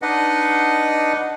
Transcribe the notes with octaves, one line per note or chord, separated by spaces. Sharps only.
D4 D#4 B4 D#5 F#5